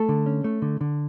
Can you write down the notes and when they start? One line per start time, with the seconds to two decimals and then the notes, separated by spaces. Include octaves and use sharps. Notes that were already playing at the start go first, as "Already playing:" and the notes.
Already playing: A3 A4
0.09 D3
0.26 C#4
0.44 A3
0.62 D3
0.81 D3